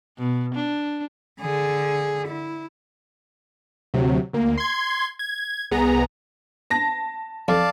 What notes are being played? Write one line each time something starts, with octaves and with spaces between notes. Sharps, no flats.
B2
D4
D3 G#4
E4
D2 C3 F#3
D2 A#3
C6 G#6
G#6
C2 B3 G#4 A#5
A5 A#6
F2 D5 F5 A5